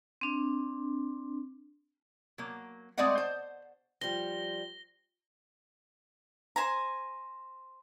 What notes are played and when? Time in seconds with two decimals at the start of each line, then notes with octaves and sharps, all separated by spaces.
0.21 C4 D4
2.38 F#3 A#3
2.98 G#3 A3 C4 D5 D#5 F#5
3.18 C5
4.01 F3 G3 A#6 G7
6.56 C5 G#5 A#5